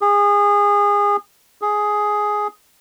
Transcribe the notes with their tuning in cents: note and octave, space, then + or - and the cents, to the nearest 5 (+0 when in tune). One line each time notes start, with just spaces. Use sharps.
G#4 -25
G#4 +5